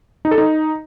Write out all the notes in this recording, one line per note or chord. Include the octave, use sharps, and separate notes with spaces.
D#4
A4
D#4